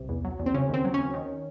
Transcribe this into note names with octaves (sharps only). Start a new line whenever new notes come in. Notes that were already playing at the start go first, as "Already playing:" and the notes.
Already playing: C2 C3
E2
F#3
E2
C4
C#3 C#4
D#2 C4
F#3
D#2 C#4
D#3